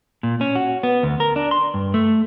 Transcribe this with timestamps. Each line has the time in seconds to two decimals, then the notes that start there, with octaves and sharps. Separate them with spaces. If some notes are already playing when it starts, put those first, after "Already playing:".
0.23 A#2
0.41 C#4
0.55 F#4
0.83 B3
1.03 D2
1.20 A#4
1.36 D4
1.51 C6
1.74 G2
1.94 A3